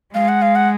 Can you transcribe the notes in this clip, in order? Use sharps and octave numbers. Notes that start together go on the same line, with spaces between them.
G#3 F5
F#5
F5
F#5